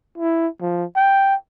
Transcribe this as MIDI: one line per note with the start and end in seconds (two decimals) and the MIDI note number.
0.18 0.47 64
0.61 0.85 53
0.96 1.35 79